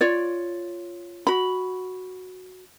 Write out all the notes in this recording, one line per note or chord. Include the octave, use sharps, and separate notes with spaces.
F4 C#5 D5
F#4 B5